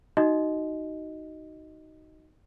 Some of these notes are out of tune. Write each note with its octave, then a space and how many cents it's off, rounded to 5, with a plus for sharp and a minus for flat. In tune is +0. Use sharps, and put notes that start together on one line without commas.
D#4 +0 F#4 +15 D#5 +5